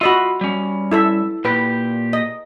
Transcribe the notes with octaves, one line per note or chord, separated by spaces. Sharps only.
F4 F#4 D#5 E5 B5
G3 C#4
E4 A4 E5
A#2 G4 B4
D#5